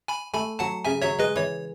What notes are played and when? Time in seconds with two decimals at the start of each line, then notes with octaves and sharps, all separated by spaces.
0.08 G#5 B5
0.34 A3 G#5 B5
0.59 F#3 F#5 A5
0.85 C#3 E5 G#5
1.02 F#3 C#5 E5
1.19 G#3 B4 D#5
1.36 E3 C#5